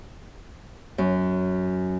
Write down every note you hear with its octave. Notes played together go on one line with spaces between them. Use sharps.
F#2